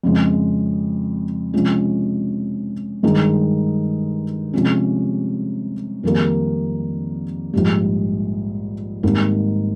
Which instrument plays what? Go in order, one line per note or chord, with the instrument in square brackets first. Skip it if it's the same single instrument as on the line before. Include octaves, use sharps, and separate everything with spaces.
[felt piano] F2 C#3 G#3
C3 F3 G#3 C#4
G2 D#3 G#3 D#4 G#4
C3 F3 G#3 C#4
F2 D#3 G3 A#3
A#1 G#2 G3
G#1 G#2 G3 A#3 D#4